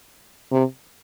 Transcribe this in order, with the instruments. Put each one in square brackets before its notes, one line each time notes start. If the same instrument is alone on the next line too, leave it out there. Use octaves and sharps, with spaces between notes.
[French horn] C3